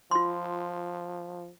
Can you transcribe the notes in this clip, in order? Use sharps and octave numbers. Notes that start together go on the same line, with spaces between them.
F3 F4 C6